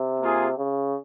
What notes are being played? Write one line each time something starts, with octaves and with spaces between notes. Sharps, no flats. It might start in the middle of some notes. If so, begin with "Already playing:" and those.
Already playing: C3
A#3 F4 G#4
C#3